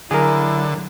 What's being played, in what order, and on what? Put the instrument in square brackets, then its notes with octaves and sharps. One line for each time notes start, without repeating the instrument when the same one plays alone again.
[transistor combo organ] D3 [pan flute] F#3 [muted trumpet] E4 [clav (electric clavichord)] G#4 A#4